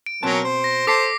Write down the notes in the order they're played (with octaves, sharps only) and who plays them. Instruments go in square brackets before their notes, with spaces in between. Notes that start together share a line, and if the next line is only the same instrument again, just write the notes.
[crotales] D7
[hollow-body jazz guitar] B2 C4 A5 [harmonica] F#3 C#4 A#4
[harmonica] C5
[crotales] A#6
[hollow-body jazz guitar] A4 A5 [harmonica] C5 [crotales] D6 B6 C7